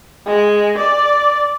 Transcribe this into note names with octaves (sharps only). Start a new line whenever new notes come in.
G#3
D5